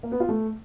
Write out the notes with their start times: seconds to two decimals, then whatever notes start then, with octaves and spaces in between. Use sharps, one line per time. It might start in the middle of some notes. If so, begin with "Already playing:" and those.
0.03 A#3
0.12 B3
0.20 F4
0.29 A3